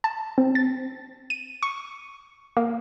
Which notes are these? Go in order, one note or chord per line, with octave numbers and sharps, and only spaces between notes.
A5
C4
A6
D#7
C#6
A#3